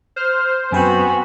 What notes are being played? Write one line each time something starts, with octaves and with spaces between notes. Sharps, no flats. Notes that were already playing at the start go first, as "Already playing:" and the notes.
C5 F6
F#2 B3 C4 F#4 B4 G#5